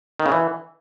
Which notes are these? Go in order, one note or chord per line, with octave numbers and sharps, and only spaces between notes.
D#3
C#3
E3